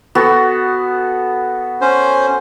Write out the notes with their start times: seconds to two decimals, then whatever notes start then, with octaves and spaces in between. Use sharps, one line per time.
0.15 B3 F#4 A4
1.81 C#4 C5